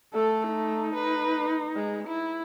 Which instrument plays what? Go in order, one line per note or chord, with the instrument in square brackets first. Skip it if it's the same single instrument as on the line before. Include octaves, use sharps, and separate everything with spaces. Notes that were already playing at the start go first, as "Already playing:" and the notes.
[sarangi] A3 [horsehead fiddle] A4
[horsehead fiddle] D#4
[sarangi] B4
G#3
E4